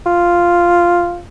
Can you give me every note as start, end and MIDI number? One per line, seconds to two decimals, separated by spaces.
0.06 1.20 65